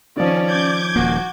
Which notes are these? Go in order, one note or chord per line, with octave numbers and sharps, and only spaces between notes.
D#3 F3 C#4 D5
D6 G6 G#6
D#1 A#3 F#4